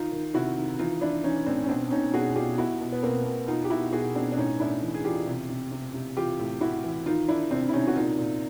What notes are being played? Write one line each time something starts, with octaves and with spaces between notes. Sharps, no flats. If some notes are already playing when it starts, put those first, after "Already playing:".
Already playing: D#3 D#4 F4
D#3
C3 E4 F#4
D#3
E3 D#4 F4
E3 D4 E4
E3 C#4 D#4
A2 C4 D4
C#4
B2 C4 D4
B2 C#4 D#4
B2 F#4 G#4
B2 F4 G4
B2 E4 F#4
B2
B3
B2 A#3 C4
B2
B2 D#4 F4
G4
B2 E4 F#4
B2 F#4 G#4
B2 C4 D4
D4
A2 C#4 D#4
A2 D4 E4
E3
G#4
E3 F4 G4
C3
C3
C3
C3
E3 F4 G4
A2
A2 E4 F#4
E3
D#3 D#4 F4
D#3 D4 E4
C3 C4 D4
E4
C3 C#4 D#4
F#4
A#2 D#4 F4
A#2